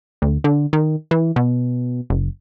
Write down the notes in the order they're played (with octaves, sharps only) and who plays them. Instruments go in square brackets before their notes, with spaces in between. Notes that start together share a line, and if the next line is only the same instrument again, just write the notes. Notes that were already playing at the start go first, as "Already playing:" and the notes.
[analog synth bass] D2
D3
D#3
E3
B2
F#1